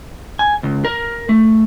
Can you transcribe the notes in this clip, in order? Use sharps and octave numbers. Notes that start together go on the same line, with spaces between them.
G#5
C#2
A#4
A3